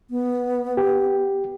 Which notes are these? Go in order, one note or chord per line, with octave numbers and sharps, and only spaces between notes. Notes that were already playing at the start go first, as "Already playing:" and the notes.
B3
G4